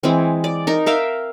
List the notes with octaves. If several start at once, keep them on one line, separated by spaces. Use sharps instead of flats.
E3 G#3 C4
D5
D#4 A#4
A#4 E5 F5 G5